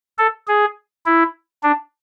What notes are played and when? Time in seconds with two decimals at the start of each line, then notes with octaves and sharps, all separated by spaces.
0.18 A4
0.48 G#4
1.06 E4
1.63 D4